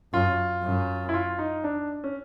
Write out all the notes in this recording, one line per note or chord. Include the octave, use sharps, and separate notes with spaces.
F#2 F4
F#2
E4
F4
D#4
D4
C#4